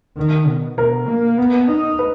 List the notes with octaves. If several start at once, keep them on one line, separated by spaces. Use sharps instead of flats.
D#3
B2
B2 A#4
A#3
B3
D#4
B4